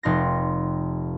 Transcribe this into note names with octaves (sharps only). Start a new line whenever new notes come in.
F1 D#4 C6 A#6